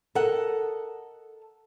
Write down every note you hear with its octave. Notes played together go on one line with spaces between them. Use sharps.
A4 A#4 D#5 F#5